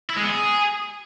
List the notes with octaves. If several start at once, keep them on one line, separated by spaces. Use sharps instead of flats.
E4
G#3
B3
G#4